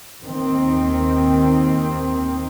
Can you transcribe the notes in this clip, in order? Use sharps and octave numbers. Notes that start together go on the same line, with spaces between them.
D#2 D#3 C4